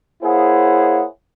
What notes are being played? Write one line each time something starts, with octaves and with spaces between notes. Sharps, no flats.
A#3 E4 G#4 C5 C#5 F#5